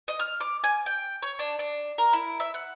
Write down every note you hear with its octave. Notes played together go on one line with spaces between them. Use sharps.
D#5
F6
D6
G#5
G5
C#5
D4
D4
A#4
E4
E5
F#5